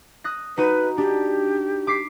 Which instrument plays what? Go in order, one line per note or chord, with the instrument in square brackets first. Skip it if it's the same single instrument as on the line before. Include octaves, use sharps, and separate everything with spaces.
[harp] D#6 F#6 A#6
[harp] D#4 F#4 D#7 [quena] B4
[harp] D4 [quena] G4
[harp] D6 B6 C7